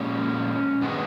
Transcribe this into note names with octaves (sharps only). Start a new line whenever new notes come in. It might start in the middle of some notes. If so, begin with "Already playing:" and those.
Already playing: A#2 F3 G#3 C#4
G2 D#3 G#3 B3